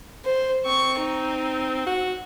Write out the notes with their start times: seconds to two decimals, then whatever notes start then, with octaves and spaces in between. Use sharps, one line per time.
0.25 C5
0.65 C4 C#6
0.98 D#4
1.86 F#4